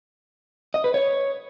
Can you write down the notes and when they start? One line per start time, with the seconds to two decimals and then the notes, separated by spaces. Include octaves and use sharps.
0.74 D#5
0.84 B4
0.94 C#5